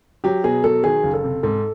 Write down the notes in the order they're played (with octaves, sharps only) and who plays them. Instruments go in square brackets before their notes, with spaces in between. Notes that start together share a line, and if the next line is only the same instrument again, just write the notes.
[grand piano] F#3 [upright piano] G4
[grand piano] B2 [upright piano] G#4
[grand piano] F#3 [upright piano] A4
[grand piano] D#3 [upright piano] G#4
[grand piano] F#1
[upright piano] A4
[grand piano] C3
[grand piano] G#2 [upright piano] A4